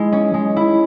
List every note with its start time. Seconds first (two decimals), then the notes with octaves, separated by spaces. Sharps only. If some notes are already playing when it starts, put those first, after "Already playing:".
Already playing: G#3 E4
0.12 C#4
0.34 G#3
0.56 E4